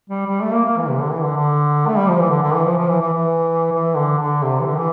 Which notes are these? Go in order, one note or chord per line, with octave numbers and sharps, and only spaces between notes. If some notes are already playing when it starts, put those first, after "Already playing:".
G3
G3
A3
A#3
A#3
E3
C3
D3
E3
D3
D3
A3
G3
F3
E3
D3
D3
E3
F3
F3
E3
E3
E3
E3
D3
D3
C3
E3
D3
E3